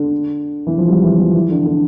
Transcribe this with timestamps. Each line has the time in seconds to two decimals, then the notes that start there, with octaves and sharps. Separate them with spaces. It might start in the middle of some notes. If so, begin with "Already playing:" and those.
Already playing: D3
0.67 E3
0.78 F3
0.88 G3
1.04 E3
1.19 F3
1.35 E3
1.50 D3
1.65 D3